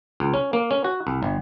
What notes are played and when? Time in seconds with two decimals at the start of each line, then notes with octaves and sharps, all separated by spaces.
0.20 C#2
0.34 C#4
0.53 A#3
0.71 C#4
0.84 F#4
1.07 C2
1.23 G1